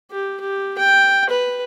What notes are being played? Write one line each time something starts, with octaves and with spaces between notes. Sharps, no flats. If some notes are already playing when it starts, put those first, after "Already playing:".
G4
G4
G5
B4